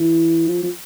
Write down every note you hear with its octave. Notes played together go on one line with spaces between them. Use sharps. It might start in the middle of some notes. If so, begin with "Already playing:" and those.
Already playing: E3
F3
F3